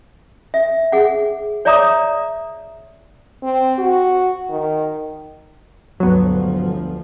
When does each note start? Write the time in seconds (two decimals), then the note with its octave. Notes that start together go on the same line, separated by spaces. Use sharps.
0.54 E5
0.92 G#4 F#5
1.65 C#5 D5 E5 A#5 D6 D#6
3.43 C4
3.79 F#4
4.50 D#3
6.00 G1 D2 F3 F#3 B3